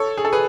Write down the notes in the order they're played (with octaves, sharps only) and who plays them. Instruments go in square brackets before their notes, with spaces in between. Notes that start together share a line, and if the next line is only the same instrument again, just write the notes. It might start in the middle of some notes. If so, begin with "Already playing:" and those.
Already playing: [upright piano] A4 C#5
G#4
A4
G#4 B4